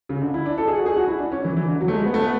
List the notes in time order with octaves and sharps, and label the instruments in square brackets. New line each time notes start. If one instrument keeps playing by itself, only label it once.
[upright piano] C#3
D3
E4
D4
A4
G#4
F#4
G#4
F#4
E4
D4
C#4
E3
E3
D3
F#3
A3
G#3
B3
A3
B3